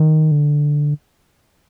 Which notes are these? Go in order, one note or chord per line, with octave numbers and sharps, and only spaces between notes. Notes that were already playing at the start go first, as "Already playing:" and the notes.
Already playing: D#3
D3